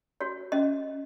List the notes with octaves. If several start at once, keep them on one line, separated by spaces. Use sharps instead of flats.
F#4 C#5
C#4 D#5